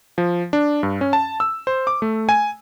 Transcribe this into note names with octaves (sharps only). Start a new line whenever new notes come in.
F3
D4
G2
C#4
A5
E6
C5
D6
A3
G#5